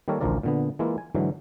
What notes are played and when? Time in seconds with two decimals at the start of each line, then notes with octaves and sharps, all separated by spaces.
0.08 D#3 G3 A#3 A4 A#4 C#5
0.21 A1 D2 F3 F4 A#4 D5
0.43 A#2 D3 B3
0.79 E3 G#3 A#3 E4 F4
0.98 G#5
1.15 G#2 D3 E3 F#3